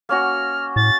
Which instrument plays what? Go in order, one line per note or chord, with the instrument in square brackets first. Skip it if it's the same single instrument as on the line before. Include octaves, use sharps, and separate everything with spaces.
[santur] A#3 C#4 F#4 [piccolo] F6
[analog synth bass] A2 [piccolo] A6